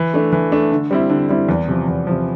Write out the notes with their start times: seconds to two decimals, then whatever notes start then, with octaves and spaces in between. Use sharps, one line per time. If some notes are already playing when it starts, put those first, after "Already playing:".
Already playing: E3
0.14 A3 D4
0.33 E3
0.52 A3 D4
0.72 D3
0.91 G3 C4 E4
1.10 D3
1.29 G3 C4 E4
1.49 E2
1.68 C3 F3
1.88 E2
2.07 C3 F3